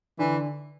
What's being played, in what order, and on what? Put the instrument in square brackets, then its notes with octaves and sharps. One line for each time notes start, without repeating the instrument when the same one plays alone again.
[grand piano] D3 [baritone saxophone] E3